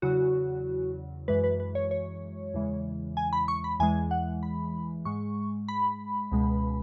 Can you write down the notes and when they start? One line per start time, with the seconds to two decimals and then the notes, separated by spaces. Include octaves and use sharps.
0.02 E2 C#3 F#3 F#4
1.28 F#2 E3 G#3 B4
1.44 B4
1.60 B4
1.75 C#5
1.91 C#5
2.54 E2 C#3 E3 G#3
3.17 G#5
3.33 B5
3.48 C#6
3.64 B5
3.79 E2 E3 G#3 G#5
4.11 F#5
4.43 B5
5.05 G#2 G#3 C#6
5.68 B5
6.32 C#2 B2 G#3